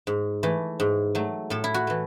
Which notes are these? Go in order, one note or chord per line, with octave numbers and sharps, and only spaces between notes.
G#2
E3 A3
G#2
F#3 A3
A2 A4
E4
F#4
E3 A3